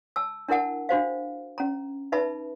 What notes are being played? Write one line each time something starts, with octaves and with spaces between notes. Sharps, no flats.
A5 E6
D4 E4 A#4 F#5 A5
D4 F#4 C5 F5
C#4 A#5
D#4 B4 E5 A5 B5